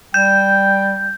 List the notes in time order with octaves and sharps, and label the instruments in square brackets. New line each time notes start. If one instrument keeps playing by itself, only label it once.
[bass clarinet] G3 [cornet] G5 [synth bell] G6